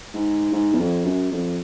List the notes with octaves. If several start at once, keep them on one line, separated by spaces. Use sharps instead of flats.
G#2
G#2
E2
F2
F#2
F2